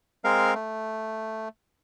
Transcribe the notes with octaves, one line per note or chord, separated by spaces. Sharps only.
G#3 C4 A#4 F5
A3